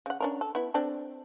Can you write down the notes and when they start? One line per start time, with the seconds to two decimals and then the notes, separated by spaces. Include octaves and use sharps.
0.06 C#3 F#5
0.20 C#4 D4 A#4
0.41 A4
0.55 B3 E4
0.74 C4 D4 A4